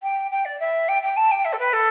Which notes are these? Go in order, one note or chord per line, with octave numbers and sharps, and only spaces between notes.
G5
G5
D5
E5
G5
G5
A5
G5
E5
A4
B4
A4